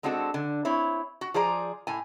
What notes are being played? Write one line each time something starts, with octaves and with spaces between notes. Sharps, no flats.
G#3 C4 D4 F#4 A4
D3
C4 E4 C#5
F#4
F3 G#4 C5 D5 A#5
A2 G#5